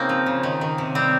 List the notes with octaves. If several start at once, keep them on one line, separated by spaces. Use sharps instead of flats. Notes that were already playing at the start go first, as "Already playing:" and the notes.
Already playing: C#3 A#3 C4 D#4
F3
C#3
D#3
D#3
C3
G3 C4